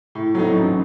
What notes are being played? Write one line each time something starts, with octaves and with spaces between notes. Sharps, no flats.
A2
F#3 A3 C4 D#4
A1